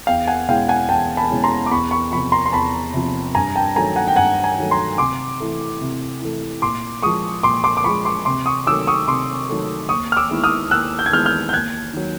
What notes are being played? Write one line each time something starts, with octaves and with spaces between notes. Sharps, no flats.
E2 F5 G5
F#5 G#5
B2 G#3 C#4 E4 F5 G5
F#5 G#5
E2 G5 A5
A5 B5
B2 G#3 C#4 E4
A#5 C6
D6
E2 B5 C#6
B5 C#6
C3 F3 B5 C#6
A#5 C6
C6
E2 A5 B5
C3 F3
G2 G#5 A#5
G5 A5
D#3 F#3 A3 G#5 A#5
F#5 G#5
G5
G2 F#5 G#5
G#5 A#5
D#3 F#3 A3
A#5 C6
C3 C6 D6
E3 A3
C3
E3 A3
A#2 C6 D6
F3 G#3 C#6 D#6
A#2 C6 D6
C6 D6
D6
F3 G#3 B5 C#6
C6 D6
C3 C6 D6
C#6 D#6
D#3 F#3 A3 D6 E6
C#6 D#6
C3 C6 D6
D#3 F#3 A3
D#2 C#6 D#6
F6
D6 E6
D#3 G#3 B3 E4
D#6 F6
D#2 E6 F#6
G6
G#6
D#3 G#3 B3 E4 F6 G6
F6 G6
G6
D#2 F#6 G#6
D#3 F#3